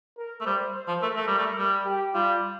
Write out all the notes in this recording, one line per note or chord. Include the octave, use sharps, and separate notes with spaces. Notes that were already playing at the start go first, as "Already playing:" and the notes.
A#4
A3
G3 C5
C5
F3
A3 A#4
A3
G3
A3
G3
G4
G3 F4